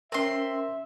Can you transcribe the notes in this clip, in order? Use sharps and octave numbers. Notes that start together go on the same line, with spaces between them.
C4 C#4 A#4 E5 C6